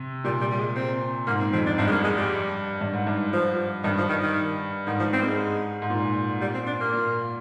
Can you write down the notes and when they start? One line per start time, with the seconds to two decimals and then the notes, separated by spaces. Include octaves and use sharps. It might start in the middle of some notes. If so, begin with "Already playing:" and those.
Already playing: C3
0.24 A#2 G3
0.41 G3
0.52 G3
0.59 G#3
0.76 C4
1.27 G#2 A#3
1.40 C4
1.53 F2 C4
1.66 D4
1.78 G2 C4
1.87 G#3
1.91 A#3
2.04 G#3
2.17 G3
2.81 G2
2.93 G#2
3.07 G2
3.33 F3
3.84 G2 D#3
3.98 F3
4.09 D#3
4.23 D#3
4.87 G#2 D#3
5.00 F3
5.13 C4
5.22 A#3
5.26 G#3
5.82 G#2
5.90 A#2
6.41 G3
6.54 C4
6.67 D4
6.81 A#3
6.93 A#2